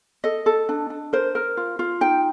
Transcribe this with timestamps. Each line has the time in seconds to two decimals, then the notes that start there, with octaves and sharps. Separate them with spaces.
0.24 A4 D#5
0.46 A4
0.69 D4
0.90 D4
1.13 A#4 C5
1.35 A#4
1.57 F4
1.79 F4
2.01 D#4 G5